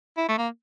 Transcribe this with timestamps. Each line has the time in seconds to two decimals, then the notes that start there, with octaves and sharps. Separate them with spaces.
0.17 E4
0.29 A3
0.38 A#3